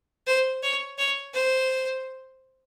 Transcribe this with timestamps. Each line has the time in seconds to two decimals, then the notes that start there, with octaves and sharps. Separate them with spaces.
0.27 C5
0.63 C#5
0.98 C#5
1.34 C5